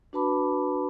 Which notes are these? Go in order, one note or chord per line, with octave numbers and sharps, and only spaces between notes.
D4 F#4 B4 A5 B5 D6